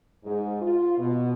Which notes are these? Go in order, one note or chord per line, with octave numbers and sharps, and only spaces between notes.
G#2
F4
B2